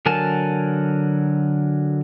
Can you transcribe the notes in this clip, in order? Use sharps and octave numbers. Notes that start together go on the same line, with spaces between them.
D3 F#3 A#4 G#5 A5